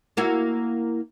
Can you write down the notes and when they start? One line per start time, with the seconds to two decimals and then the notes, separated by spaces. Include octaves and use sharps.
0.17 A#3 E4 F#4